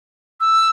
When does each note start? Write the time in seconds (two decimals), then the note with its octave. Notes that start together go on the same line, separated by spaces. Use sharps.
0.41 E6